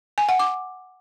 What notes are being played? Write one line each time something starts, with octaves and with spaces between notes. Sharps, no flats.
G#5
F#5
D6